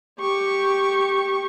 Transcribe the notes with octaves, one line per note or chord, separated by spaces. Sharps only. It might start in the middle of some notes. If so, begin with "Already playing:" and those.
G4 C#6